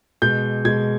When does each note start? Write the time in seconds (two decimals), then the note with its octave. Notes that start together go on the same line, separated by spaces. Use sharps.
0.22 B2 G#3 G6
0.65 B2 G#3 G#6